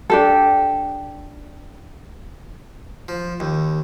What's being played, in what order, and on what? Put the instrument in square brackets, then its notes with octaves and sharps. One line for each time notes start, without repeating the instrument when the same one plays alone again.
[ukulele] D4 G4 A4
[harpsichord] F3
D#2